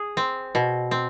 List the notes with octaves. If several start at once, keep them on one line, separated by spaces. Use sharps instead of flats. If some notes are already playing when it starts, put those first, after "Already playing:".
Already playing: G#4
C4
B2
C4